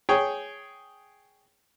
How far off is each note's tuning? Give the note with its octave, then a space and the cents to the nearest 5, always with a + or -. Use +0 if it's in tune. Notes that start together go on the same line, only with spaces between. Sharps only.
G#4 +0 C#5 +0 G5 -5